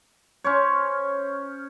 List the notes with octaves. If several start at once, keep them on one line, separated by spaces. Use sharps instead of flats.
C#4 C5 C#5